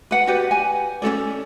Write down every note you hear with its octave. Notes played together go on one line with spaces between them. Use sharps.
B4 F#5
F#4 G4 B4 D5
G#5
C#4 D#4 A4 D5